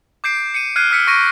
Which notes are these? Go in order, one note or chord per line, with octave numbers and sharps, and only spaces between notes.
D6 G6 C7 D7
C#7 D#7
F6 F#6 G#6 C7 D#7
E6 F6 B6 C#7 D7
C#6 F6 A#6 D7 D#7